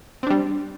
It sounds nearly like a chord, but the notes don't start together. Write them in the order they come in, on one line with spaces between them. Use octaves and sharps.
C4 D4 G3